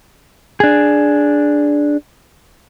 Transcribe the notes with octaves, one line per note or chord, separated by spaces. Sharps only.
D4 G#4